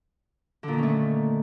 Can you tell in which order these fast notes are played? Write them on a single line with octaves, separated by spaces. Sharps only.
D3 A#2 D#3 C#4 A3